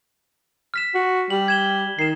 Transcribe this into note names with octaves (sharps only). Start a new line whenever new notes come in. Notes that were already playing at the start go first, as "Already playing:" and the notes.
F6 B6 E7
F#4
G3 F#7
G#6 E7 G7
D#3 C7 E7